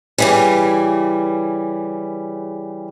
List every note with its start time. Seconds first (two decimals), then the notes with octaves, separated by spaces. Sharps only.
0.18 C#3 E3 G3